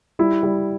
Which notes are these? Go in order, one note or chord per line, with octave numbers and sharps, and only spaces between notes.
G3 E4
G3